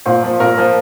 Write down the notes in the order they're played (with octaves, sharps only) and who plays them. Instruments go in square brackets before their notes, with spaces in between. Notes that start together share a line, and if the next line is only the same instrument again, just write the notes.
[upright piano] A#2 C5
F3
A#2 A#4
F3